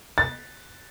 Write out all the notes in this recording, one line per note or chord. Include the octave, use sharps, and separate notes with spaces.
A6